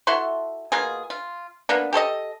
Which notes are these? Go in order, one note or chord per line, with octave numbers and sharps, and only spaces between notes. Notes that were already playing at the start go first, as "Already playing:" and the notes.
E4 F#4 A4 C6
B2 A#3 F4 G#4
F4
A#3 B3 D4
G4 A4 C5 D#5